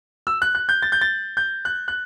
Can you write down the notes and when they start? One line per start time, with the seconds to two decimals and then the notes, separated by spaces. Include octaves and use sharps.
0.27 E6
0.42 F#6
0.55 F#6
0.69 G6
0.82 A6
0.92 G6
1.01 A6
1.37 G6
1.65 F#6
1.88 F#6